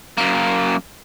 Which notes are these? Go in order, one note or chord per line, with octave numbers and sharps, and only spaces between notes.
F#2 A#3